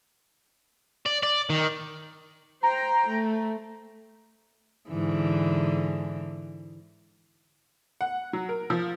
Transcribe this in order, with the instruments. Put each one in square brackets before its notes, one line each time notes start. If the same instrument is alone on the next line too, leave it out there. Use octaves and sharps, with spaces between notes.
[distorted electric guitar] D5
D5
D#3
[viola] C5 G5 [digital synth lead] A#5
[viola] A3
[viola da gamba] G#2 D3 E3
[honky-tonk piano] F#5
F#3
A#4
F3